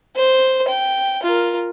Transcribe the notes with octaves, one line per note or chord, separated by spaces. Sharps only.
C5
G5
F4 A#4